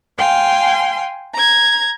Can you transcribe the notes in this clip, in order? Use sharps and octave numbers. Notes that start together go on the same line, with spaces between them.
F5 G5 G#5 C6
A#5 G#6